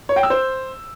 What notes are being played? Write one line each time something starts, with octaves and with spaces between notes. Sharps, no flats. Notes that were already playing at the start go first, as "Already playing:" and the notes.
C#5
G5
E6
C5